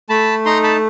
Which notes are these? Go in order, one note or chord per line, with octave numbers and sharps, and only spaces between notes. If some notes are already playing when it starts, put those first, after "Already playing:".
A3 A5 B5
D#4 A#5 C6
A5 B5